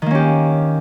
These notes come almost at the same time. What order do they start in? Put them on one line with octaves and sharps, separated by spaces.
D#3 A#3 C#4 G4